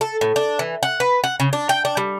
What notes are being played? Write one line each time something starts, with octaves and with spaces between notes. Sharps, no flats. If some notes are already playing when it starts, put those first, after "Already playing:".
A4
A2
D4
E3
F#5
B4
F#5
C#3
D4
G5
D4
G3